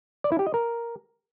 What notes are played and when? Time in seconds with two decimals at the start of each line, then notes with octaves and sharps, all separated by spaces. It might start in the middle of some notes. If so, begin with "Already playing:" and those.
0.24 D5
0.32 E4
0.39 G4
0.46 D#5
0.54 A#4